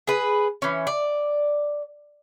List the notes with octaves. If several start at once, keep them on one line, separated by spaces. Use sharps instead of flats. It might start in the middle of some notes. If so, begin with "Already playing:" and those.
G#4 B4
E3 C#4
D5